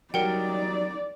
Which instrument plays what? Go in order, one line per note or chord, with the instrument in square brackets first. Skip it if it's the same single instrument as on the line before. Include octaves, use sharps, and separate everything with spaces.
[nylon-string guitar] F#3 G3 [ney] D#4 [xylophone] A#4 F#5 G5 [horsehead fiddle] D5